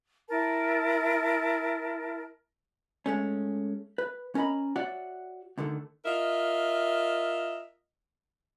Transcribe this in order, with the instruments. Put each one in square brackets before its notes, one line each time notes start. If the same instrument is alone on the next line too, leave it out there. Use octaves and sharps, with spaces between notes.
[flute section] E4 A#4 A5
[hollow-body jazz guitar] G#3 A3 C#4
B4
C#4 A#4 D#5 A#5 B5
F#4 C#5 D5 E5 F#5
D2 D3 D#3 A3
[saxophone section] F4 A#4 D#5 E5